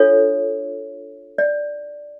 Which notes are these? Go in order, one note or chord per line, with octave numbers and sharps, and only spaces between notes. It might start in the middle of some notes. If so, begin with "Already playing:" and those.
Already playing: D4 F4 A4 C#5
D5